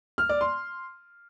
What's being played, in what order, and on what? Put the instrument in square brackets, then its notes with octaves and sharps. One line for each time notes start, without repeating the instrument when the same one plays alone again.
[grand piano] F6
D5
C6